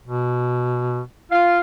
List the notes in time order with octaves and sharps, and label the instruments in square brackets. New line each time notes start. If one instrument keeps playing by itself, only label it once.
[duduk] B2
[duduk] F4 [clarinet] F5